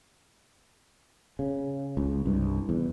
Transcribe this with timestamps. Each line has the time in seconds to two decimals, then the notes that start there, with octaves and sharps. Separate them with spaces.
1.39 C#3
1.97 C#2
2.26 C2 G2
2.69 E2